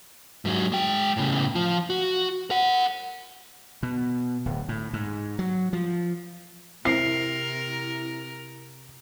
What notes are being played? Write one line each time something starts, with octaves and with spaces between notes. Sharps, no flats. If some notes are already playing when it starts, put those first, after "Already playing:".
G#2 F#3
G#3 G5
A2 C#3
F3 F4
F#4
A#4 F#5
B2
D1
A2
G#2
F#3
F3
C3 C4 E4 A#4 C7